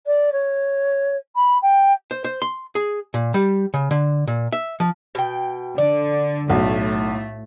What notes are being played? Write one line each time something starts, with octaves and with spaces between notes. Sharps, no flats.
D5
C#5
B5
G5
C5
C5
C6
G#4
A#2
G3
C#3
D3
A#2
E5
F3
B2 G5
D3 D5
B1 A2 A3